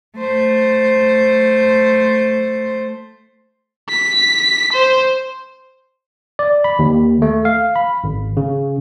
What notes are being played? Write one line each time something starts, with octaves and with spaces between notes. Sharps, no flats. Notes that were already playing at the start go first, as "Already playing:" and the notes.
A3 C5
B6
C5
D5
B5
D#2
A3
F5
B5
G#1
C#3